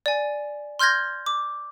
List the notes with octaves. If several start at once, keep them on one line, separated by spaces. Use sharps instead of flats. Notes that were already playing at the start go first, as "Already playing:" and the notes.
D5 G#5
C6 F6 G6 G#6 A#6
D6